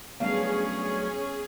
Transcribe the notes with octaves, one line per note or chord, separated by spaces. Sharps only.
F#3 G3 A3 B3 C#4 D4 G#4 F5